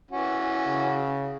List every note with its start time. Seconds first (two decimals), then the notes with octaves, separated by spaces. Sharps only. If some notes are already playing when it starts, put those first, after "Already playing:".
0.11 E3 C#4 F#4
0.67 C#3